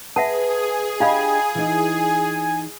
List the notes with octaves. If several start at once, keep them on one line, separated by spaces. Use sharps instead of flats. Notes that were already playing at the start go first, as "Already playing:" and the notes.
G#4 B4 E5 F#5 A5
D4 F4 G4 D#5 F5 G#5 B5
E3 D#4